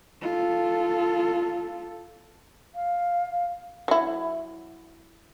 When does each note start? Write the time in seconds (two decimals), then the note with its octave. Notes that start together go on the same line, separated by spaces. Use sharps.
0.22 F4 A4
2.75 F5
3.88 F#3 E4